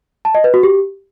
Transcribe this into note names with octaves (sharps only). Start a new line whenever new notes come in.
A5
D#5
B4
F#4
G4